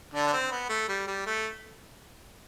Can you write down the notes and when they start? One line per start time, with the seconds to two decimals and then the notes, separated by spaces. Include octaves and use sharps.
0.14 D3 D4
0.27 D4
0.33 C4
0.52 B3
0.70 A3
0.89 G3
1.07 G3
1.27 A3